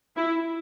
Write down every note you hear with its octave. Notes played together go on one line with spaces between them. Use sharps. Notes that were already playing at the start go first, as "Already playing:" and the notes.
E4